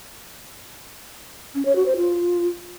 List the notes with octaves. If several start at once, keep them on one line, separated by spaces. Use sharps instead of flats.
C#4
C#5
F#4
C5
F4